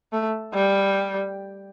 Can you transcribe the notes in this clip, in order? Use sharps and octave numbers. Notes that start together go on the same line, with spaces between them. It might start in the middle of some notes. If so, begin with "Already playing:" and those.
A3
G3